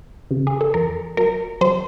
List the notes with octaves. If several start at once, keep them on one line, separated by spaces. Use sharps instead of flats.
C#3
G#4
A4
F2 A#4
F#3 A#4
F#3 C5